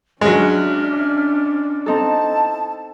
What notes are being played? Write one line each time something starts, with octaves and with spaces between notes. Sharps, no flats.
F#3 G#3 C#4 D4 E5 F6
C4 D#4 E4 A4 A5